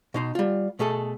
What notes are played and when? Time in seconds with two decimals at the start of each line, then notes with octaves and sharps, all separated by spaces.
0.14 B2 D#4 C6
0.35 G3 F4
0.79 B2 A3 G#4 A4